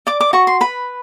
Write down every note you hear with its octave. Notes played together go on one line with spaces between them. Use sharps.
D5 D6
D6
F#4 C#6
C6
B4 B5